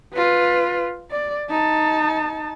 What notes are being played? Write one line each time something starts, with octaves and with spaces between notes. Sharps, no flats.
F4 B4
D5
D#4 A5